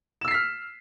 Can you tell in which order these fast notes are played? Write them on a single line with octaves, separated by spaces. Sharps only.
E7 E6 C7 B6 F6